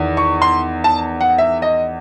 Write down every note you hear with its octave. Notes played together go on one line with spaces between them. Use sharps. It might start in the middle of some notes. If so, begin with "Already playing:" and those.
Already playing: E2 D#3
C#6
C6
A5
F#5
E5
D#5